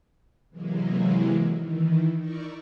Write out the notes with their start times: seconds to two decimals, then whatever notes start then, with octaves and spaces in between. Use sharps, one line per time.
0.50 C3 E3 F#3 G#3 A#3
1.52 D#3 E3
2.17 D#4 E4 A#4 D5 C#6